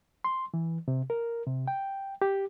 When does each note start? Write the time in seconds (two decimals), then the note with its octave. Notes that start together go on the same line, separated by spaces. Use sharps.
0.24 C6
0.54 E3
0.88 C3
1.10 A#4
1.46 C3
1.68 G5
2.22 G4